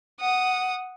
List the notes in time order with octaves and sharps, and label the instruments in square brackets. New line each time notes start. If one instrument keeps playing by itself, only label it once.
[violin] F#5 D#6